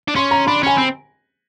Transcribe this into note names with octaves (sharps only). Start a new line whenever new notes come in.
D4
C#4 C6
A#5
D4 B5
C#4 G#5
C4